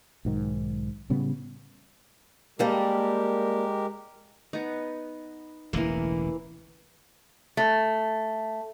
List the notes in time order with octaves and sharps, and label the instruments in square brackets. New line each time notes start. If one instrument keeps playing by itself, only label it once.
[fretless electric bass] B1 G#2 D#3
A2 C#3 G3 B3
[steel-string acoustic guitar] G3 A#3 A4 [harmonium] G#3 G4 A#4
[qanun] B3 D#4
[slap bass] E1 A1 D3 [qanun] E3 A#3
[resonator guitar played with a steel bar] A3